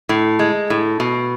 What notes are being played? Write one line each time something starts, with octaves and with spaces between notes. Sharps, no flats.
A2
G#3
A2
B2